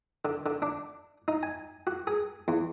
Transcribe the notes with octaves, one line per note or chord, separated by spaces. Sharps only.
D3
D3
D4
D#4
G#5
F#4
G#4
E2